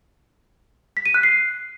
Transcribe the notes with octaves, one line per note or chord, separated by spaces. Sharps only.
B6
D#7
F#6
C7